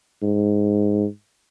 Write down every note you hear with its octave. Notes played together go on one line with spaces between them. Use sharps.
G#2